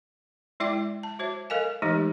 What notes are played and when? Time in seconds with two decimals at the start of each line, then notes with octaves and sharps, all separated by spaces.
0.60 G#3 E4 D5 E5 G5 D6
1.03 A5
1.19 F#4 C5 C#5 E5
1.50 A4 A#4 D#5 F5 G#5
1.82 E3 G#3 A3 D#4 G4 D#5